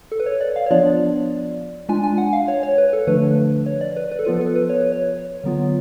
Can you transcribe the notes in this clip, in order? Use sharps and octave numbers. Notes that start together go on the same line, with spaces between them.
A4
B4
C#5
D5
F5
C#5
F3 B3 D4 F4 D5
G#3 D4 F4 G#5
G#5
F#5
F5
C#5
C#5
B4
A4
D3 F3 A3 D4 B4
C#5
D5
B4
B4
A4
F3 B3 F4 B4
A4
B4
C#5
B4
C#5
D3 F#3 B3 F4